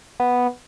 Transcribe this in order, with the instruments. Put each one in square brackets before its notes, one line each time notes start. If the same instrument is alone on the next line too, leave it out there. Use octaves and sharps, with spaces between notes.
[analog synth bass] B3